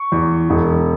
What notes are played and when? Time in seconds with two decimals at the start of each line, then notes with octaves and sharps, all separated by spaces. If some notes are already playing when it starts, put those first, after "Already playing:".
Already playing: C#6
0.12 E2
0.50 E1